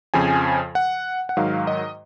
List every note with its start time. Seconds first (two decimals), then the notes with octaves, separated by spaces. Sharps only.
0.14 F2 C#3 F3 G#5
0.75 F#5
1.29 F#5
1.37 G#2 D#3 F#3 F5
1.67 D#5